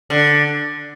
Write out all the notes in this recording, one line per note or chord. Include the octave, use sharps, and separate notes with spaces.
D3